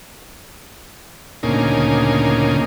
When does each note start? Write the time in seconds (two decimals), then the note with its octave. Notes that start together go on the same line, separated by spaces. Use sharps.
1.43 D2 A#2 C#3 A#3 D#4 G#5